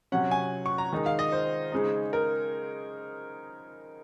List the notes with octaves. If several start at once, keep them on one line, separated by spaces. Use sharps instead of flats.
C3 F#3 C#4 F#5
G#5
C#6
A#5
D#3 G#3 D#4
F5
D#5
C5
C#3 G#3 D#4
A#4